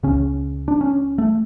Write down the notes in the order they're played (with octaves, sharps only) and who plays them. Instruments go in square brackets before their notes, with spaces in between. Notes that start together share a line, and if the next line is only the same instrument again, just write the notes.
[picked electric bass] C#2 C#3 C#4
D4
C#4
A3